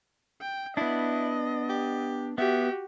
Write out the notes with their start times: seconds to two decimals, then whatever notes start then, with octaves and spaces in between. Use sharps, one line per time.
0.41 G5
0.77 B3 D4 E4 D#5
1.69 G4
2.38 B3 F#4 G4 E5